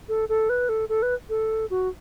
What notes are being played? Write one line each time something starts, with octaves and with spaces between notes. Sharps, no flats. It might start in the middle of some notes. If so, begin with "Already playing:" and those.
A4
A4
B4
A4
A4
B4
A4
F#4